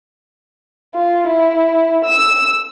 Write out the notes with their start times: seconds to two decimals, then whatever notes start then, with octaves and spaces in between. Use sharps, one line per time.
0.95 F4
1.27 E4
2.04 E6